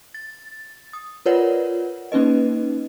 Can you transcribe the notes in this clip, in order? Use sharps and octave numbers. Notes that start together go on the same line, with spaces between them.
A6
D#6
F4 A#4 B4 C#5 D5 F#5
A#3 C#4 D#4 B4 D#5